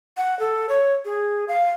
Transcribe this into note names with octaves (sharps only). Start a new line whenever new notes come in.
F#5
A4
C#5
G#4
F5